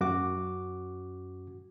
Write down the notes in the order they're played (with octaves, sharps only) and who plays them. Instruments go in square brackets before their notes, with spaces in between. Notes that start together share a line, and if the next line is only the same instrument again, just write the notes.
[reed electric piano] F#2 F#4 D6